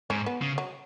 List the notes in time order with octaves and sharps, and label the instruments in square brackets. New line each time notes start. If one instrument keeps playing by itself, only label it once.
[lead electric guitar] G#2 [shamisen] C#4
[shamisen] B3
[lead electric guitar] C#3
[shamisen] F#3